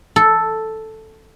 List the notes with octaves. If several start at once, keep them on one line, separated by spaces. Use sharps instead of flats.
A4